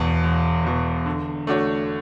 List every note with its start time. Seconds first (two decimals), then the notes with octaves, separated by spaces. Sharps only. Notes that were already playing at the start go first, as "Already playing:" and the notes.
Already playing: E1 E2 B2
0.24 E1
0.64 E2 B2
1.06 D3
1.47 A3 D4 F#4 C#5